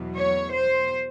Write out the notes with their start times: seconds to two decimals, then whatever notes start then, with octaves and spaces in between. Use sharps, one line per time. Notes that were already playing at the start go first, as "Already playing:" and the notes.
Already playing: E2 B2 F#3
0.15 C#5
0.53 C5